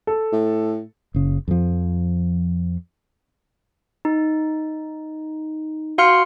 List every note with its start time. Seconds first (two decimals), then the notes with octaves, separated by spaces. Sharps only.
0.07 A4
0.32 A2
1.14 F#1 C#3
1.48 F2 F3
4.05 D#4
5.98 F#4 F5 C6 F6 C#7